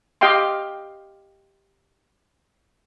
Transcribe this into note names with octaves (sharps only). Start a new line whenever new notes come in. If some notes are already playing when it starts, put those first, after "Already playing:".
G4 D#5 F5 G5 C6